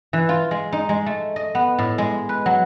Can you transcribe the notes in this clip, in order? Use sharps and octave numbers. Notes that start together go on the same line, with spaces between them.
E3
F4
G#3
D#4
G#3
A3
D#5
B3
A2
G#3
B4
F#3